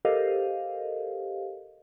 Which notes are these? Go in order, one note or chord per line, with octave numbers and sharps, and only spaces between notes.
G4 A4 A#4 C5 D#5 F5